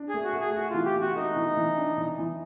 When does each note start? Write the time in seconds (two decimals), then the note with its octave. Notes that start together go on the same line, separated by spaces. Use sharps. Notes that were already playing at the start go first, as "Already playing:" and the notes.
Already playing: D4
0.09 G#4
0.14 A3
0.24 F#4
0.34 A3
0.40 G#4
0.54 A3 F#4
0.70 E3 F4
0.85 G4
0.96 E3
1.01 F#4
1.16 A3 D#4
1.36 E3
1.57 E3
1.78 D4
1.98 E3
2.19 E3